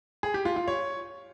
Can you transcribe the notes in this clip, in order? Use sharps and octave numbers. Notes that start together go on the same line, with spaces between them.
G#4
G4
F4
F4
C#5